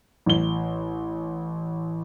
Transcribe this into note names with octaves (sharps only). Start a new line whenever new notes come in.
A1 G7